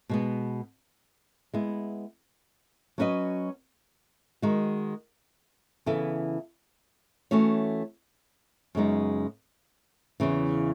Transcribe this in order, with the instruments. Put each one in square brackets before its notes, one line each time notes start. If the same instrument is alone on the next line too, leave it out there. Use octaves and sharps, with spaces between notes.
[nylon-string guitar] B2 G#3 B3
G#3 B3 E4
F#3 C#4 F#4 B4 D#5
D#3 G#3 D#4 F#4
C#3 E3 B3 E4 A4
E3 A3 C#4 F#4 C#5
F#2 C#3 G#3 B3 D#4
E2 C#3 E3